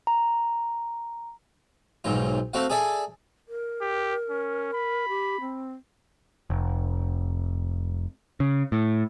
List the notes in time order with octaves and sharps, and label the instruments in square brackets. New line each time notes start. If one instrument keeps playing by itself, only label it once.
[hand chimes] A#5
[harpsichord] B1 G#2 F#3 F4
A3 C4 F#4 F5 F#5
G#4 A4 D5 E5 G#5
[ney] A#4
[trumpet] G4
C#4
B5
[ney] G4
C4
[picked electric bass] F1
C#3
A2